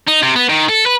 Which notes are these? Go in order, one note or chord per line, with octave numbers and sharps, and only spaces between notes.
D#4
C3
B3
D#3
A4
B4